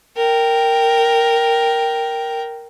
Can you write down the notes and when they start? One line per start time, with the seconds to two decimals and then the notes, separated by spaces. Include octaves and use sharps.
0.17 A#4 G5